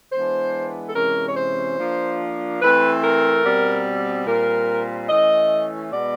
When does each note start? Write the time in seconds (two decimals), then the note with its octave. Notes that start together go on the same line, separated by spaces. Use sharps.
0.12 E3 G#3 B3 D4 C5
0.88 A4
0.95 C3 E3 G#3 C#4 A#4
1.27 C#5
1.36 C5
1.78 F3 A#3 D4
2.61 E3 A3 C4 B4
3.03 A#4
3.44 B2 G3 C4
4.26 A#2 G3 C4 A#4
5.09 E3 A3 C#4 D#5
5.92 B2 G#3 B3 D5